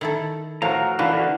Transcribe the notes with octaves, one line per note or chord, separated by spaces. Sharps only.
D#3 E4 A4
A2 F3 F#4 A#4 F5 A#5
E3 A#3 D4 E4 F#4 B4 F5
D3 F#4